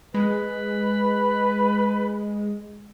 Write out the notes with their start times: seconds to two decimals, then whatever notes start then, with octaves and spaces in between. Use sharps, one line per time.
0.14 G#3 B4